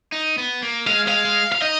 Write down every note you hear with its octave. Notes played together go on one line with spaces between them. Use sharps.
D#4
B3
A#3
G#3 F5
G#3 F5
G#3
F5
D#4 D#5